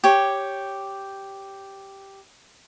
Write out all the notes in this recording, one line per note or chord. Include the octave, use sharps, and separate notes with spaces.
G4 C#5